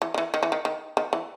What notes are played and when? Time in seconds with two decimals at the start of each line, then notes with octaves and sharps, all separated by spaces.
0.02 E3
0.14 D#3
0.18 E3
0.34 D#3
0.43 E3
0.52 D#3
0.65 D#3
0.97 D#3
1.13 E3